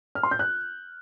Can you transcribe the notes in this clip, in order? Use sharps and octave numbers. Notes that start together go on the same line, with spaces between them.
F6
C6
G6
F#6